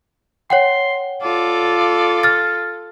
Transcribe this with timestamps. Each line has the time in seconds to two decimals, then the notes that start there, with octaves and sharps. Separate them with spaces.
0.50 C#5 F#5 G5 C6
1.22 F4 A4 D5
2.23 F6 A6